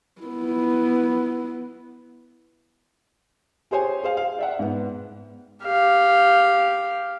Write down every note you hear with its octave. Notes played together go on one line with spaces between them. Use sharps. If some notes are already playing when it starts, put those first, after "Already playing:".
B3 E4
G4 G#4 C5 C#5 G#5
G#4 C5 F5
F5
D5 E5 F#5
G#2 B3
G4 F5